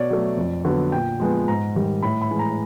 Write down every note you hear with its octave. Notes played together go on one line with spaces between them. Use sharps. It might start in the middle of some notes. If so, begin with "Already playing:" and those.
Already playing: B2 C#5 D5
F#3 A3
F2
D3 F#3 B3
A#2 G5
F3 G#3 B3
G#2 A#5
D#3 G3
A2 B5
B5
E3 G#3
A#5